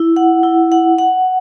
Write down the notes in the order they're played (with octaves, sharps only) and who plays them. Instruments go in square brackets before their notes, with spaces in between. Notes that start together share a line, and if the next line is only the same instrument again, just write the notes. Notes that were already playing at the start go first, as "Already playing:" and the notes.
Already playing: [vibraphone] E4
F#5
E4
F#5
F#5